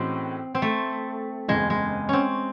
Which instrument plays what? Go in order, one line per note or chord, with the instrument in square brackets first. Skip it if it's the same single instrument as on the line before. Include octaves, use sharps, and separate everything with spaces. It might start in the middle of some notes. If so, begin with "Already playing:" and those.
Already playing: [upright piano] A2 E3 G#3 C#4 F#4 [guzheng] C4
[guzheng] C4
A3
[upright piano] F#1 E2 C#3 [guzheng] G#3
[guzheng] G#3
C4 C#4